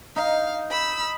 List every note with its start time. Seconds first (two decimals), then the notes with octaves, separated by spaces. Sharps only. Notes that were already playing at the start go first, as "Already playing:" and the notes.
0.16 D#4 F5
0.71 B5 E6